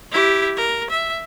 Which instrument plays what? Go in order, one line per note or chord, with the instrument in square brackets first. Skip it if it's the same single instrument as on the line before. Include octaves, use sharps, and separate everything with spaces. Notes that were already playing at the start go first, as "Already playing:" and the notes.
[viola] E4 G4
A#4
E5